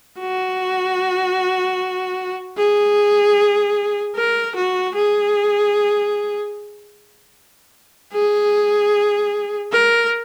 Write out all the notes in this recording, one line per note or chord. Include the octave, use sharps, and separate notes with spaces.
F#4
G#4
A#4
F#4
G#4
G#4
A#4